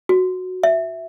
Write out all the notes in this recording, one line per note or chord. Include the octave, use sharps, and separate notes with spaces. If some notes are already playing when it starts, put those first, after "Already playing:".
F#4
E5